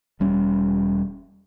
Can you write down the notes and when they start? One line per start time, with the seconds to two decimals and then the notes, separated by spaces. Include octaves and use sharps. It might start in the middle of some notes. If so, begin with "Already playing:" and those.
0.20 E1 G3 C#4